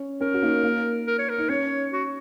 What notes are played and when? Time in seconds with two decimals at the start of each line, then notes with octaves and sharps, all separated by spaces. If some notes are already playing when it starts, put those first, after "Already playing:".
Already playing: C#4
0.21 C#4 A#4
0.34 F#4
0.42 A#3 D#4
0.63 A#3
1.07 A#4
1.19 C#5
1.29 A#4
1.38 D#4
1.49 C#4 C#5
1.92 F#4